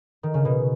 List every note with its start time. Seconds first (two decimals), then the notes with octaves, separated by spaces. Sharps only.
0.23 D#3
0.34 C#3
0.45 B2